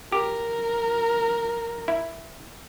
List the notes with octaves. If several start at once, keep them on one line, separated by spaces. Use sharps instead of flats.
G4 A#4
E4